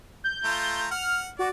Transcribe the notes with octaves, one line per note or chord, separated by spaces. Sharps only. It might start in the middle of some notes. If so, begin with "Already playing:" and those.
G6
A3 F4 A#5
F#5 F6
F#4 D5